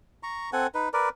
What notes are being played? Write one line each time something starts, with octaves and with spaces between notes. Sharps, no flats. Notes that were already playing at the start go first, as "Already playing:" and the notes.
A#5 C#6
C4 A4 F#5 G#5
D#4 B4
A#4 B4 D5